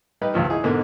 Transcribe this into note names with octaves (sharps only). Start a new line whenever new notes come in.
G3 D#4 B4
G#1 C#2 G2 F3
E3 D#4 G#4
G#2 B2 D3 A#3